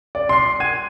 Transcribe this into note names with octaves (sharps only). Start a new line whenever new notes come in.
D5
C6 C7
F#5 G#6 D#7